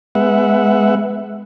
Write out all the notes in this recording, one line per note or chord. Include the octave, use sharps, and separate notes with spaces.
G#3 B3 E5 F#5